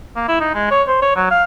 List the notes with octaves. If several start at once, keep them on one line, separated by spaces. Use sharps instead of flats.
A#3
E4
D#4
G#3
C#5
C5
C#5
F#3
F5